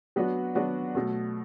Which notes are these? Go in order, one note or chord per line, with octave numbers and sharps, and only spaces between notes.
F#3 B3 D4 F#4
F#3 B3 D4 F#4
B2 F#3 A3